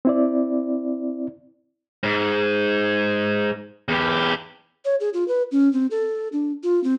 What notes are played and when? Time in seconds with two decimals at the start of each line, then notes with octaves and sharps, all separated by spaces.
0.05 C4 E4 D5
2.03 G#2
3.89 E2 G4
4.85 C#5
5.00 G#4
5.14 F4
5.28 B4
5.51 C#4
5.73 C4
5.91 A4
6.32 D4
6.63 F4
6.84 C4